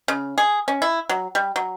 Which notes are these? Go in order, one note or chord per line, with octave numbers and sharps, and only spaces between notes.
C#3
G#4
C#4
E4
F#3
G3
F#3